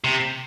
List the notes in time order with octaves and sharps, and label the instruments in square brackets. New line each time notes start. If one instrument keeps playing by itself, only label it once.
[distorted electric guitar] C3